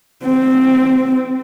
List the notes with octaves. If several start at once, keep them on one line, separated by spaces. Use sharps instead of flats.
C4